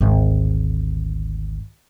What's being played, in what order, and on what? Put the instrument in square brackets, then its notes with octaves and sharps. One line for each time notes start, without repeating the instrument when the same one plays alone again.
[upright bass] G#1 D2